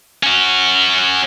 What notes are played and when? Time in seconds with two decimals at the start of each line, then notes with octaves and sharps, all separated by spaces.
0.23 C#4 F#4